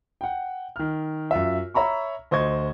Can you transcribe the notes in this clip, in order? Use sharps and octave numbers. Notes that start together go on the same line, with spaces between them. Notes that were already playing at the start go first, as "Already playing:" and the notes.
F#5 G5
D#3 F6
F#2 F4 E5
C#5 E5 A#5 B5 C#6
D2 C5 D#5 C#6 G#6